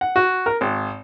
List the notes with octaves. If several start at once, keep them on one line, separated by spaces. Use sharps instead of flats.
F#5
F#4
A#4
G#1